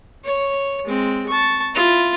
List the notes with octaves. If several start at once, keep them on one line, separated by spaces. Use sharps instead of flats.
C#5
G#3 C4
A5 C#6
E4 F4